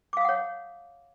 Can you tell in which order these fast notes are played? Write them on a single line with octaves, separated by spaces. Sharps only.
D6 F5 D#6 F#5 C#5